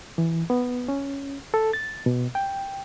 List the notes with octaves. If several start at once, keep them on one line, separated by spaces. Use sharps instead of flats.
E3
B3
C#4
A4
A6
B2
G5